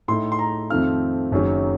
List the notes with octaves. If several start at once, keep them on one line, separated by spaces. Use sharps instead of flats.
A2 A3 D#4 C6
C6
A#5
F2 D#3 A3 C4 F4 F6
F#1 F#2 D#3 F#3